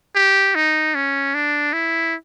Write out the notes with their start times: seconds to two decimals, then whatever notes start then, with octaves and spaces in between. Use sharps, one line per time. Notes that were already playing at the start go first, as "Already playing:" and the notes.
0.15 G4
0.55 D#4
0.95 C#4
1.34 D4
1.73 E4